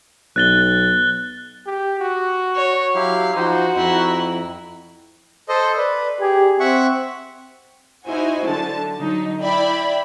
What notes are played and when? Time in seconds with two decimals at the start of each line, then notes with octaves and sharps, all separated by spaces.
0.36 B1 F#6 A6 G7
1.66 G4
2.00 F#4
2.56 C#5
2.95 F#3 E4 G4 F5
3.36 F3 D#4 F#4 C5
3.76 F2 E4 A#5
5.49 A4 C5 D#5
5.77 B4 D5
6.21 G4 G#4
6.60 C4 E5 F#5 C#6
8.06 D#4 E4 F#4 C5 G#5
8.46 D3 F#3 A5
8.97 D3 F#3 D#4
9.41 E4 D5 E5 G5 B5